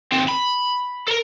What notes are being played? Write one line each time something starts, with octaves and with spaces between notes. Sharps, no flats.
D#2 C4
B5
A4 A#4